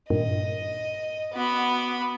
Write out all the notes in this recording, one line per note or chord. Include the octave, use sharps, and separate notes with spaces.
G2 A#2 D#3 D#5
B3 F#4 B5 D6